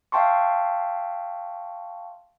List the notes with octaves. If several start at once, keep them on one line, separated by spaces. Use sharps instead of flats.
E5 F5 G5 A5 C6 C#6